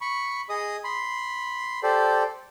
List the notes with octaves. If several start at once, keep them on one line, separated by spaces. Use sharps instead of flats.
B5 C#6
G#4 D#5 D#6
B5 C6
G4 A4 C5 D5